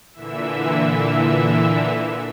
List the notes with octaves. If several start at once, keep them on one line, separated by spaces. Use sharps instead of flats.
A#2 D3 E3 E5 E6